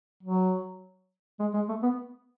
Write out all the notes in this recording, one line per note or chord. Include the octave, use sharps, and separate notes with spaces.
F#3
G#3
G#3
A3
B3